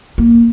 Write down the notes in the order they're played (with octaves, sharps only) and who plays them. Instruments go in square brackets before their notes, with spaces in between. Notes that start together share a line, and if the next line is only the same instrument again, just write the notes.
[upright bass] A#3